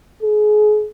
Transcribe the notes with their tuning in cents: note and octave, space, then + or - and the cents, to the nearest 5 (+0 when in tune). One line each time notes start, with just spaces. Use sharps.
G#4 +30